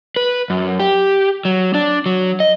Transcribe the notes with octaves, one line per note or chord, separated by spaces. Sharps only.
B4
F#2
G4
F#3
D4
F#3
D#5